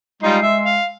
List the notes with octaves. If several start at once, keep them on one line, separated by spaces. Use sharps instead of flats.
G3 G#3 D#4 F4 C6
E5
F5